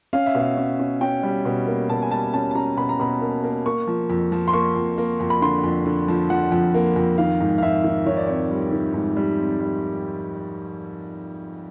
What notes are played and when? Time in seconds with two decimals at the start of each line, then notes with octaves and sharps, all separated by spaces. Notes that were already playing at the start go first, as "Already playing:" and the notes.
0.13 C#4 F5
0.26 E5
0.35 B2
0.40 F5
0.57 C#4
0.79 C#4
1.01 C#4 G5
1.23 G3
1.45 B2
1.67 A#3
1.89 B2 A5
2.02 G#5
2.11 G3 A5
2.33 C#4 A5
2.51 A5
2.55 C#4 A#5
2.77 B2 B5
2.89 A#5
3.00 B2 B5
3.21 A#3
3.44 A#3
3.66 A#3 C#6
3.87 F3
4.10 F2
4.32 F3
4.48 C6
4.53 A#3 C#6
4.76 F2
4.98 A#3
5.20 F2
5.30 B5
5.42 D3 C6
5.64 F2
5.86 D3
6.08 F3
6.30 F3 F#5
6.52 F2
6.74 A#3
6.96 F2
7.18 D#3 F5
7.40 G#2
7.58 F5
7.62 G#2 E5
7.84 D#3
8.06 D#3 C#5
8.17 D5
8.27 C4 C#5
8.50 G3
8.72 D#3
8.94 G#2
9.17 G3
9.38 C4
9.60 G3